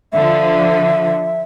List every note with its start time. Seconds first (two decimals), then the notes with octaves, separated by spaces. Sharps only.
0.13 D3 F3 E5